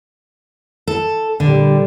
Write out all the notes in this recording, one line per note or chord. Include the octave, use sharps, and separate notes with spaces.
A4
A#2 D3 G3